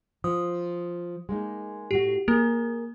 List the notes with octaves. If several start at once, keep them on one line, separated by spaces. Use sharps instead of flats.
F3 D#6
G#3 A#3 D#4
A2 A3 F#4 G4
A#3 G#4 A#4